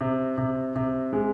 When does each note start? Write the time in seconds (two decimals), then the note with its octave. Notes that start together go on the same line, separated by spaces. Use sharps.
0.01 C3
0.38 C3
0.76 C3
1.13 G#3